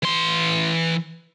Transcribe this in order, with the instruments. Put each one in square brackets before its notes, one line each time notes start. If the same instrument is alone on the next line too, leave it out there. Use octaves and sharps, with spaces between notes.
[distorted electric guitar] E3 C6